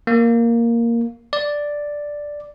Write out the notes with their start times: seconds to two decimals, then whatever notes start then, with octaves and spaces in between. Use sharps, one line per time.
0.07 A#3
1.33 D5